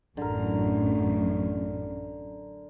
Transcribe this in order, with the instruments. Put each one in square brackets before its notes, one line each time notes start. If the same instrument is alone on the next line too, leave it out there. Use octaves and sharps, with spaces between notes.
[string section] A1 F#2 [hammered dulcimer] D3 A#4